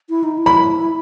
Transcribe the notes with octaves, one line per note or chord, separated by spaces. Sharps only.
E4
D#4
E4
B5